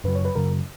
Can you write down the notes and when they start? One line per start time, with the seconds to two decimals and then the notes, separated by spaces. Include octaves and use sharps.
0.04 F#2 C#3 F#3 B4
0.15 C#5
0.25 B4
0.35 F#2 C#3 F#3 A#4